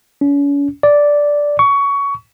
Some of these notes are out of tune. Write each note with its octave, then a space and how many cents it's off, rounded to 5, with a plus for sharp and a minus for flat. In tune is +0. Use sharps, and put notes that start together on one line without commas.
C#4 +40
D5 -5
C#6 +20